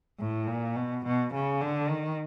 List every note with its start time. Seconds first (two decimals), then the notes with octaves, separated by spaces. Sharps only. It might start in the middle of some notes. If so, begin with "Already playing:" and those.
0.19 A2
0.47 A#2
0.76 B2
1.05 B2
1.33 C#3
1.61 D3
1.89 D#3